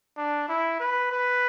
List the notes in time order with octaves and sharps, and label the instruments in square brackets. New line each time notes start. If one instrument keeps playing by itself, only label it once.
[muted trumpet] D4
E4
B4
B4